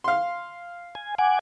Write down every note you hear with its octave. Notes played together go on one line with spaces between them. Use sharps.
F5 C6
G#5
F#5 G#5 D6